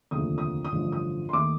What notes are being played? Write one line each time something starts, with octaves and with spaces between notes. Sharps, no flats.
F1 D#2 D3 F3 A3 D#6
D#6
D#6
A1 G2 D3 F3 A3
D#6
C6
D#2 D#3 A3 D6